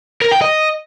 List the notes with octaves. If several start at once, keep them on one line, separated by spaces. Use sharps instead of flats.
A#4
G5
D#5